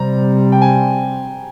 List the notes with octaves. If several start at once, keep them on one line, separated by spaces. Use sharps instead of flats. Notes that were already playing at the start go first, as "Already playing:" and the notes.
Already playing: C3 G3 C4 A#5
G5
G#5